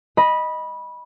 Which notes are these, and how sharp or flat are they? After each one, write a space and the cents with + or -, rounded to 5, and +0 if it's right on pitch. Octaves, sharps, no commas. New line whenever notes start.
D#5 +0 B5 -15